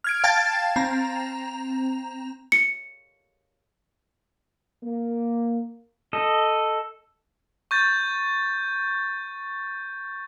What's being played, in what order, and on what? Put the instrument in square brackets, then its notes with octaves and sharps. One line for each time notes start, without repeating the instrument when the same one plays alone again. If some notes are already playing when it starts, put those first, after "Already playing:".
[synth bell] F6 G#6 D7
F5 G5 A5 G#6 A6
C4 A#5
[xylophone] C#7
[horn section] A#3
[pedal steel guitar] A4 D#5
[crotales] C#6 G6 A6